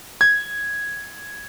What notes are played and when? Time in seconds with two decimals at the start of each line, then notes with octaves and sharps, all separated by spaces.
0.21 G#6